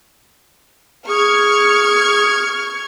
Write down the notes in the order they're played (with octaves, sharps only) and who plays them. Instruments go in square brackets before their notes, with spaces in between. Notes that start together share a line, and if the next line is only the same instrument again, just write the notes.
[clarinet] G#4 [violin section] C#6 F6 G#6